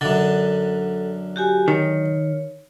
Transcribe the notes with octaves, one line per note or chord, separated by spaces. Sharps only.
F#2 D3 A4
F#4 G4 G#5
D#3 C#5